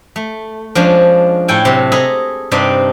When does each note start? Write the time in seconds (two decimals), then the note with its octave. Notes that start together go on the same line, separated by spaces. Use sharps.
0.16 A3
0.75 F3 G#3 C#4 D4
1.48 A2 E4 A4 G5 G#5
1.65 C3 F#3
1.92 G#4 A4 D#5 A#5 B5
2.51 G2 C3 D4 D#4 D5